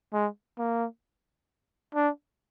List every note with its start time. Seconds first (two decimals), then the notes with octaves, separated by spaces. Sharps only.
0.13 G#3
0.58 A#3
1.95 D4